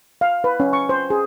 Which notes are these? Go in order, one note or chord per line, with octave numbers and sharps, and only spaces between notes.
F5
B4
C#4
C#6
C5
G#4